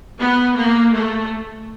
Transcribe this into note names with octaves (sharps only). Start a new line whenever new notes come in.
B3
A#3
A3